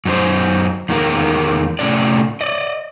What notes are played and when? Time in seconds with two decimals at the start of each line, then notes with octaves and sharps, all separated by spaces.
0.05 F#2 D#4 C5
0.89 E2 D#3 G#3 A#3 A#4
1.79 A2 C3 C#4 D5
2.41 D5 D#5